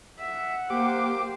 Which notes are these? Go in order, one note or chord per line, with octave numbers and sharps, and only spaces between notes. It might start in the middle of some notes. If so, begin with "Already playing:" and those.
E5 F#5
A#3 G4 C5 D6